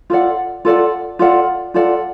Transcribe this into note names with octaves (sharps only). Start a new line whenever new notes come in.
F4 A4 D5 F#5
F4 A4 D5 F#5
F4 A4 D5 F#5
F4 A4 D5 F#5